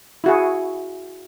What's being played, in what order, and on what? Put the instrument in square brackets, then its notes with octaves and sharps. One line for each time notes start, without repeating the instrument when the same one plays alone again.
[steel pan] E4 F#4 G#4